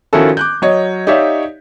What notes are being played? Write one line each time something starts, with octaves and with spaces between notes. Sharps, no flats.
D#3 F3 C#4 E4 F#4 A4
D6 F#6 G6
F#3 C#5 D#5
D#4 G4 C#5 D5 E5 F5